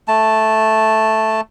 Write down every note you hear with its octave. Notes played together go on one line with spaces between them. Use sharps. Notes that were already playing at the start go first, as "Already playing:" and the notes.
A3 A5